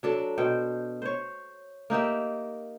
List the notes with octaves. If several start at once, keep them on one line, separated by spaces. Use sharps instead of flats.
F#3 D4 A4
B2 C5 G5
C5 C#5
A#3 D#4 G4 E5